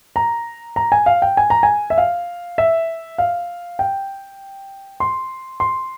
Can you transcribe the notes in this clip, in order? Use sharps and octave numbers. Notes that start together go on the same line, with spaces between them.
A#5
A#5
G#5
F5
G5
G#5
A#5
G#5
E5
F5
E5
F5
G5
C6
C6